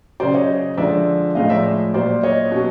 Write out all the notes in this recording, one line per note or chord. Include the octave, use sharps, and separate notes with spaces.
C#3 F#3 C5 D5
C#5 D#5
D3 F3 G#3 D5 E5
A2 F3 G#3 D#5 F5
D5 E5
A#2 F#3 C5 D5
C#5 D#5
B2 F#3